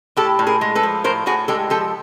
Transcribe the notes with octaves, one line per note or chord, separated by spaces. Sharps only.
A2 G4 A4
A2
G#4 A#4
G#3
A4 B4
F3
A2 A#4 C5
A2 F#4 G#4
G#3 G4 A4
F3 G4 A4